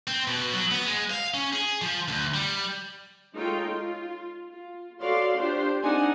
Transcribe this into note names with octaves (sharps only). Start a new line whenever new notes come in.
C4
B2
F#3
B3
G#3
F5
C#4
G#4
F3
D2
G3
G#3 D#4 F4 A4 C#5 G5
F4
F4
F#4 A4 C#5 D5 F5 C6
D4 F4 G4 C5
C4 D4 D#4 F#5 G#5